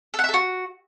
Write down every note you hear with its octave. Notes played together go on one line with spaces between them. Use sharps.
A4
F#5
E5
A4
F#4